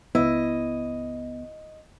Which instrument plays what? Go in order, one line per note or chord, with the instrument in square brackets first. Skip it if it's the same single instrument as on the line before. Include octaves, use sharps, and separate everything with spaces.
[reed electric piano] C#2 B3 [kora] E4 [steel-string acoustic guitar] D#5